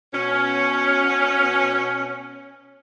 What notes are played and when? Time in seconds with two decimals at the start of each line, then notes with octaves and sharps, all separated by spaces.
0.13 B2 C#4